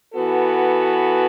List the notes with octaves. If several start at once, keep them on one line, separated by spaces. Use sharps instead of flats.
E3 B3 F#4 A4